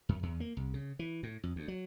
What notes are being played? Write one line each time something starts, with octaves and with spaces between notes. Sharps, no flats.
F#2
E2
A#3
C2
C#3
E3
A2
F2
D2
F#3